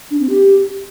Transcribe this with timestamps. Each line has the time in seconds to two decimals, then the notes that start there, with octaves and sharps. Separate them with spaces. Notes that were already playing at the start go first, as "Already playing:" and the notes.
0.11 D4
0.20 C4
0.30 G4